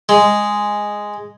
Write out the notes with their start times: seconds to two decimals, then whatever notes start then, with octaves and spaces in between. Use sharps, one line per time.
0.09 G#3